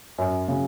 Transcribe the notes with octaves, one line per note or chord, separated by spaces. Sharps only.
F#2
C#3 F#3